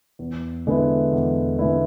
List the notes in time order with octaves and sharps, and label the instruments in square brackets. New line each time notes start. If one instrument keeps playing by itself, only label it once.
[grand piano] E2
D3 G#3 B3 E4
E2
D3 G#3 B3 E4